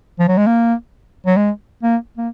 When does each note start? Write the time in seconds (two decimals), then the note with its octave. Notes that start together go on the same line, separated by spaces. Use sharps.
0.19 F3
0.28 F#3
0.38 G#3
0.47 A#3
1.26 F#3
1.37 G#3
1.83 A#3
2.17 A#3